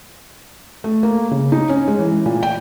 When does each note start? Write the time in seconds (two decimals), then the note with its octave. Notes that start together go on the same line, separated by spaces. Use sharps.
0.84 A3
1.03 A#3
1.31 C#3
1.52 D#4
1.69 C#4
1.88 G#3
1.99 E3
2.26 A#2
2.43 G5